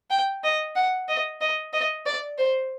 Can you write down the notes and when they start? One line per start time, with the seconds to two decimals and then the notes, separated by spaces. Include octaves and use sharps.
0.10 G5
0.44 D#5
0.76 F#5
1.09 D#5
1.41 D#5
1.73 D#5
2.06 D5
2.38 C5